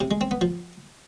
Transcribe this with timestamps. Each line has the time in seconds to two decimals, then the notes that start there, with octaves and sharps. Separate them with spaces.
0.01 C3
0.11 G#3
0.21 C4
0.31 B3
0.41 F3